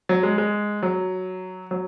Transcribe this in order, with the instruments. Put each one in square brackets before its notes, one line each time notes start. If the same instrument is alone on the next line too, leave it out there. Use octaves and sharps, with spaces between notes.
[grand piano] F#3
G#3
G#3
F#3
F#3